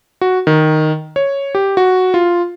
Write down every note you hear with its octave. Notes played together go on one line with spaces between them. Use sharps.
F#4
D#3
C#5
G4
F#4
F4